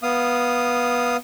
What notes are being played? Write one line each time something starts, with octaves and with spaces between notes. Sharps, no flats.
B3 F5 D#6